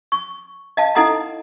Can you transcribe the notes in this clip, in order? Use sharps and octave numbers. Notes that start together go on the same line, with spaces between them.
C#6
D#5 F5 A5
D#4 E4 A4 D#5 F#5 A#5